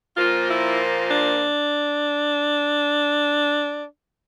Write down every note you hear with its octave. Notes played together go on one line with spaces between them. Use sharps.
A#2 F3 A#3 F4
E4
D4